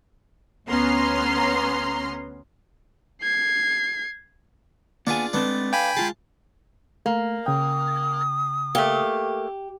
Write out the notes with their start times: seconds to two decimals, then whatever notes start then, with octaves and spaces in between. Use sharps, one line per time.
0.68 D2 B3 C#4 A#5 C6 F6
3.23 G#6 C7
5.07 A#3 B3 D4 F4 G#4 G#5
5.33 G#3 A3 B3 C4 D4
5.73 F5 G5 G#5 B5
5.97 G#3 F4 G#4 A5
7.06 A3 A#3
7.46 C#3 G5 D#6
8.75 A3 A#3 G4